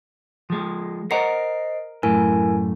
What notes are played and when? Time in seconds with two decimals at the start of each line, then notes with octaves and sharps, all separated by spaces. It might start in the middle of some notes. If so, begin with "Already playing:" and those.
0.50 F3 G#3
1.11 A#4 C5 D#5 F#5 A#5 C7
2.03 F#2 A2 E4 A#4 G#5